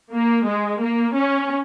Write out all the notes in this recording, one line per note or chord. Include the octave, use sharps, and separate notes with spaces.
A#3
G#3
A#3
C#4